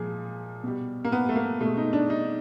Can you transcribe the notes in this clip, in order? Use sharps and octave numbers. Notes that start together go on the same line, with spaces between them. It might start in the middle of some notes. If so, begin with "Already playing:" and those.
Already playing: A#2 F3 G#3 G#4
B2 G3
A#3
B3
A3
A#3
B2 G#3 A3
D#4
D4
D#4